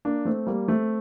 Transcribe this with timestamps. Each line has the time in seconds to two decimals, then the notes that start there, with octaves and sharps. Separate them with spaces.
0.05 A#3 D4
0.25 A3 C4
0.47 G3 A#3
0.68 A3 C4